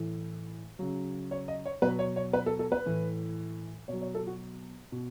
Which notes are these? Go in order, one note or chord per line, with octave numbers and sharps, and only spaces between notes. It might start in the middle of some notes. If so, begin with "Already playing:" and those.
Already playing: A2 E3
C#3 F#3
C#5
D#5
C#5
B2 F#3 B4
C#5
C#5
B4
A4
A4
B4
A2 E3
B2 F#3 C#5
C#5
A4
F#4
B2